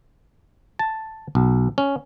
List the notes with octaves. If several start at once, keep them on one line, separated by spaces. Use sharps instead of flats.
A5
B1
C#4